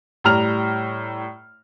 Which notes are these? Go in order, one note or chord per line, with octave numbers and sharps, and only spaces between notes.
A2 G3 A#5 F6 F7